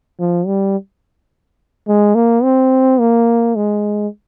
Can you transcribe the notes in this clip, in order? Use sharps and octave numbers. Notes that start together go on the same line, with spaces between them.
F3
G3
G#3
A#3
C4
A#3
G#3